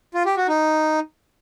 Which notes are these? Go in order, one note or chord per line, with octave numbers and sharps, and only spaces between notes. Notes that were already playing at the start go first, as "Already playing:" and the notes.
F4
G4
F#4
D#4